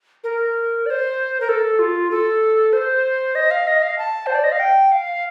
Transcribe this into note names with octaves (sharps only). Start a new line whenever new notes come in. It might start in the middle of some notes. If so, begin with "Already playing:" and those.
A#4
D5
C5
A#4
A4
F4
A4
C5
D#5
F5
D#5
F5
A5
C5
D5
D#5
F5
G5
F5